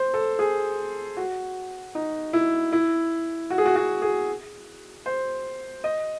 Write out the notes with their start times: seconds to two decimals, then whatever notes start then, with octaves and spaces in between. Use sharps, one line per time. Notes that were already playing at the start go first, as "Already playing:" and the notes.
Already playing: C5
0.14 A4
0.39 G#4
1.17 F#4
1.95 D#4
2.33 E4
2.73 E4
3.50 F#4
3.58 G#4
3.66 F#4
3.76 F#4
4.02 G#4
5.06 C5
5.84 D#5